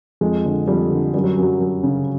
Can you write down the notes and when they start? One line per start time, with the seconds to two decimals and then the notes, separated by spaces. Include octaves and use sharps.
0.21 F2 G#3
0.45 D3
0.67 F2 G3
0.91 D3
1.14 F#2 G3
1.24 F#3
1.38 F#2 F#3
1.60 F#2
1.83 C#3